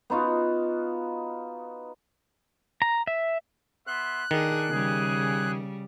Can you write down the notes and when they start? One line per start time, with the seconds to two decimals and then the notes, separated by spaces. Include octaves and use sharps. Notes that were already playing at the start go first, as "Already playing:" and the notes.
0.10 B3 D#4 F4 F#4
2.82 A#5
3.07 E5
3.87 B3 E5 C6 F#6
4.31 D#3 D4 G#4 A4
4.70 C#3 G3 G#4